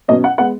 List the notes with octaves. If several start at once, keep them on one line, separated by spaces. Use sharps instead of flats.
B2 F#3 C#4 D#5
F#5
G#3 B3 F#5